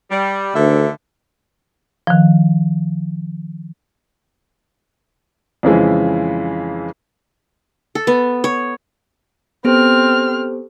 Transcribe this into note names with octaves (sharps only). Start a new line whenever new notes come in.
G3
D2 D3 D#3 E5
D#3 F3
F2 C#3 E3 G#3
A4
B3
C#5
B3 C4 G4 A4 C5 F6